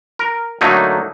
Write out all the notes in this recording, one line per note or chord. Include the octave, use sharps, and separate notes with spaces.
A#4
D3 F#3 A3 A#3 D#4